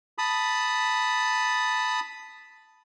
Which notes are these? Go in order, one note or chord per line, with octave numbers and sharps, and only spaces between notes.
A5 B5 D#6